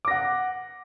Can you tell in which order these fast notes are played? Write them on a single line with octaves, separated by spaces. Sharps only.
D6 A#6 F#5